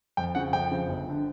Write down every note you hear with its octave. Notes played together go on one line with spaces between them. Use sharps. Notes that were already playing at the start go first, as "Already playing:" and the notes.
F2 G5
C#3 F3 F#5
F2 G5
C#3 F3
G1
D3